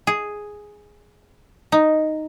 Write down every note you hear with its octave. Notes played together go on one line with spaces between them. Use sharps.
G#4
D#4